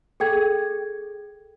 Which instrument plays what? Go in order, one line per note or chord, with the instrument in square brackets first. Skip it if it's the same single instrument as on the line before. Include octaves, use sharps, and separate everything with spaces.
[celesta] G#4 A4 G5 G#6